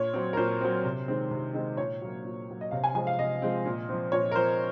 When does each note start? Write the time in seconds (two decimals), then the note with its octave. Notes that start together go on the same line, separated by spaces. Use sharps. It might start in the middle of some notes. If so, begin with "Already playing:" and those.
Already playing: A#2 C#5
0.14 F#3 C4
0.33 A#4
0.37 A#2 C5
0.61 F#3 C4
0.84 C3
1.08 D#3 G#3 C4
1.31 C3
1.54 D#3 G#3 C4
1.77 A#2 C#5
2.02 F#3 A#3
2.25 A#2
2.48 F#3 A#3
2.61 D#5
2.71 C3 F5
2.84 G#5
2.95 F3 G#3 C4 G#5
3.07 F5
3.19 C3 D#5
3.42 F3 G#3 C4
3.65 A#2
3.89 F3 C4
4.12 A#2 C#5
4.31 A#4
4.35 F3 C4 C5